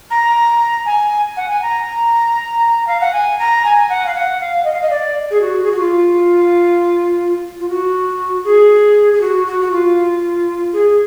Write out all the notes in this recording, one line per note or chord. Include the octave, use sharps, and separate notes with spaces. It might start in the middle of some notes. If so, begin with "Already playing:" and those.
A#5
G#5
F#5
G#5
A#5
F5
F#5
G#5
A#5
G#5
F#5
F5
F#5
F5
D#5
F5
D#5
D5
G#4
F#4
G#4
F#4
F4
F4
F#4
G#4
G#4
F#4
F#4
F#4
F4
G#4